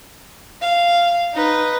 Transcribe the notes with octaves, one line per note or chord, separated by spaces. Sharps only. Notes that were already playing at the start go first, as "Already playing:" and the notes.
F5
D#4 B4